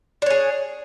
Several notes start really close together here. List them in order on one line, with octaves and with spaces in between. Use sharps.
D4 C#5 G#4